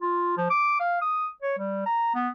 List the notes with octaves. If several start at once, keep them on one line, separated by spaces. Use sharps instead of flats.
F4
F3
D6
F5
D#6
C#5
G3
A#5
B3